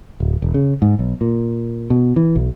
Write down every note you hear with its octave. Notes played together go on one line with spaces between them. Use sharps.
D1
E1
C#3
G#2
B1
A#2
B2
E3
B1